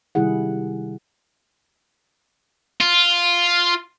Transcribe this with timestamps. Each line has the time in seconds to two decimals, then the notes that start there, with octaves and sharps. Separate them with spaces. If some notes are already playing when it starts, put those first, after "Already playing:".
0.15 C3 D#3 G3 E4 G#4 F#5
2.81 F4